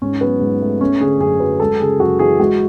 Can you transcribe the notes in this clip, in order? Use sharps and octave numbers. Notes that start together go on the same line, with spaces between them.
G#2 C#4
F#3 B3
G#2
A3
A3 C#4
D3 G#4
F#2 G#4
F#3 B4
G#3 A4
C#3 G#4
F#2 F#4
E3 G#4
G#3 F#4